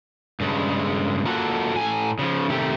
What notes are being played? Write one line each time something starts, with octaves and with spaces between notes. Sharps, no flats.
G2 C#3 G#3
A#3 F4 F#4 A4 E5 F#5
A2 G#5
C#3 F3
C3 D#3 A3 G4